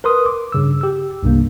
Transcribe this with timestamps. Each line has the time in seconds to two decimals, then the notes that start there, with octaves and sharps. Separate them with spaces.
0.04 A#4 B4 C6 D#6
0.26 D6
0.52 G2 C#3 E6
0.81 G4 E6
1.23 C2 G2 C3 A#3